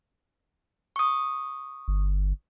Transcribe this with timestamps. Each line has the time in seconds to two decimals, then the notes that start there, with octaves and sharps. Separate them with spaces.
0.96 C#6 D#6
1.88 G1